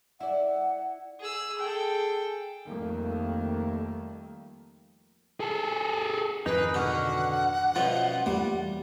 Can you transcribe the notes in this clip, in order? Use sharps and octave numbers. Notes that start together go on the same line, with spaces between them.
E4 D5 F#5
G#4 E6
G#4 A4 G5
F2 D#3 G3 A3 A#3
G#4 A4
F2 G#2 D#3 D#4 G#4 B4
B2 D3 F#4 F#5 F6
F#2 B2 F3 F4
E2 G3 A3 A#3